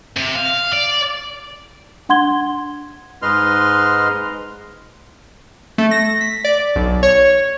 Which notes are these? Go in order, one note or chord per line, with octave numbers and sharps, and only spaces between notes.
C3
F5
D5
D4 F#5 C6 G#6 G7
G#2 G#3 B4 D#5 C6 F6
A3
A#6
B6
D5
B1
C#5